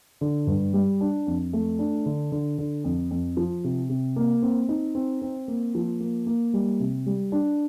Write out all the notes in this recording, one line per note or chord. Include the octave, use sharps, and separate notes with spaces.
D3
G2
G3
D4
F2
A3
D4
D3
D3
D3
F2
F2
F3
C3
C3
A#3
C4
D#4
C4
C4
A#3
F3
A#3
A#3
G3
C3
G3
D4